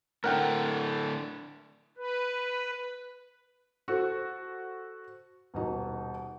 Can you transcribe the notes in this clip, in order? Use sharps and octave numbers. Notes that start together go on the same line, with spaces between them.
A2 D3 A3 A#4 F#5 G5
B4
F#4 A4 C5
D#1 B2 D#4